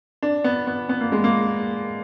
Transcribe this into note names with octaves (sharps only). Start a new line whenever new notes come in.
D4
B3
B3
B3
A#3
G#3
A#3